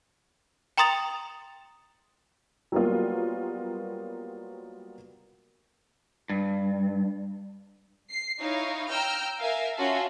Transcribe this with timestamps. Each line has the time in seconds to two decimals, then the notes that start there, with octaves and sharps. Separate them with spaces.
0.78 G5 A#5 C6 D#6 A6 F7
2.72 F#3 G3 A#3 B3 F4
6.30 G2
8.08 C7
8.40 D#4 E4 C#5 F5
8.88 G5 A#5 E6 F6 G6
9.40 A#4 E5 F5 G#5
9.76 C#4 F4 F#4 E5 F5 A5